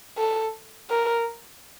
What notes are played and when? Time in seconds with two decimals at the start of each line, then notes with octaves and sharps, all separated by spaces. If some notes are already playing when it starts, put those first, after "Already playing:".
0.18 A4
0.90 A#4